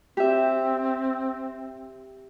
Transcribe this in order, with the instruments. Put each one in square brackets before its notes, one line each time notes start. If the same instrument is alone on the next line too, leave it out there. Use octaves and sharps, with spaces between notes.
[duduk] C4 [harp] G4 E5